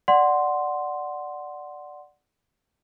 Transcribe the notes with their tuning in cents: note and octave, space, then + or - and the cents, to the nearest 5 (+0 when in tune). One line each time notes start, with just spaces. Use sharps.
D5 +0 F#5 +0 C6 +0